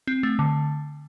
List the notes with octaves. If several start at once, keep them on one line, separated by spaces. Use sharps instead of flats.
C4
A3
D3